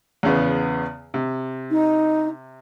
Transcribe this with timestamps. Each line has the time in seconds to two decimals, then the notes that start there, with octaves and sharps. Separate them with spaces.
0.23 E2 C#3 B3
1.14 C3
1.71 D#4